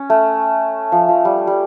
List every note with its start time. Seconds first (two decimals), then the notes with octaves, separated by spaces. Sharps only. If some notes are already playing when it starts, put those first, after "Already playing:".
Already playing: C#4
0.10 A3
0.92 F3
1.08 F3
1.25 G3
1.47 G3